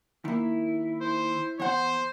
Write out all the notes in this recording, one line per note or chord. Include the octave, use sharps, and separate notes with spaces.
D#3 A#3 E4
C5
E2 C5 F#5